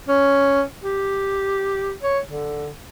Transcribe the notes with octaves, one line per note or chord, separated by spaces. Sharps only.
C#4
G4
C#5
D3